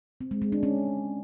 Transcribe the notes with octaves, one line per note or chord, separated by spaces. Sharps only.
C4
G#3
G#3
D4
C#4